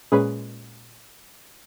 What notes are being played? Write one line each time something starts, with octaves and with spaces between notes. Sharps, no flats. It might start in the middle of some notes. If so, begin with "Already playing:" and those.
A#2 G#3 C#4 G#4 B4